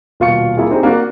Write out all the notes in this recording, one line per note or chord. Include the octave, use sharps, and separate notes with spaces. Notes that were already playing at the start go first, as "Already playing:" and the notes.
D#1 B2 F4 F5 C#6 C#7
A#3 E4 F4 G#4
C4 D4 D#4 G4 G#4
A#3 D4 F#4